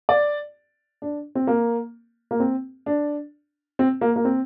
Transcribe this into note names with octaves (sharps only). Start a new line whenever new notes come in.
D5
D4
C4
A#3
A#3
C4
D4
C4
A#3
A#3
C4